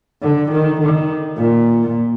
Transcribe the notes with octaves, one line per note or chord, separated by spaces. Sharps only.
D3
D#3
D#3
A#2